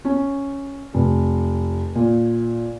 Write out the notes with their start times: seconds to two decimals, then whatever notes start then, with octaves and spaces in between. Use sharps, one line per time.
0.05 C#4
0.94 F1
1.95 A#2